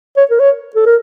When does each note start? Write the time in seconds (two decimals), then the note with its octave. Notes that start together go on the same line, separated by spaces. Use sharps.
0.17 C#5
0.31 A#4
0.40 C#5
0.75 A4
0.86 A#4